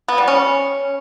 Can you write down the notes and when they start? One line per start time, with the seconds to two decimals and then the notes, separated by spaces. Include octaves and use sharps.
0.08 B3
0.18 G3
0.28 C#4